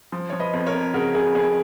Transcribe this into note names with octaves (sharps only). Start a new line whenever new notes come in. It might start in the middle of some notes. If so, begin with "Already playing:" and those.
F3
F3 C#5
B4 D#5
F2
A#4 C#5
F2
C#3 F#4 A#4
C#3 G#4
F2 G#4